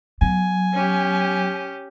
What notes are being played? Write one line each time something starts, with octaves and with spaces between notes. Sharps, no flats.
F#3 B3 G#5
C#4 G4